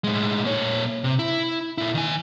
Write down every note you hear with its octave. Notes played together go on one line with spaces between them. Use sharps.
A2 G#3
A#2 C#5
C3
E4
A#2 E4
D#3 G#5